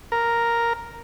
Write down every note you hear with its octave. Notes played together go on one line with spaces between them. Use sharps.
A#4